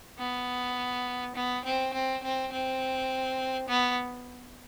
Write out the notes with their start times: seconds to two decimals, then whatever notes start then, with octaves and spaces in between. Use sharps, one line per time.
0.19 B3
1.35 B3
1.65 C4
1.94 C4
2.23 C4
2.52 C4
3.68 B3